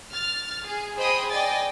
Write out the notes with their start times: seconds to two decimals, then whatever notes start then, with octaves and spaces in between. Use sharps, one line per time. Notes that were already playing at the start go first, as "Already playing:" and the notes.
0.12 F6 A6
0.66 G#4
0.96 G#4 C5 D#5 G5 B5 D#6
1.30 D5 D#5 G5 G#5 A6